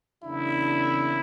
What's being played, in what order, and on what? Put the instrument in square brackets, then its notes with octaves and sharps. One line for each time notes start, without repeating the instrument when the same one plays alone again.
[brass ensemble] E2 C#3 F#3 A#3 D4 [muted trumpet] E4